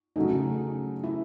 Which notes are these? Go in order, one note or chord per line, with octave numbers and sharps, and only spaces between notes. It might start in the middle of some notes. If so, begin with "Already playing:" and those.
C#3 F#3 A3 D#4
E4